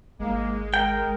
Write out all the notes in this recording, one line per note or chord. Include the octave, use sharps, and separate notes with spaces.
G#1 G#2 G#3 A#3
A#4 G5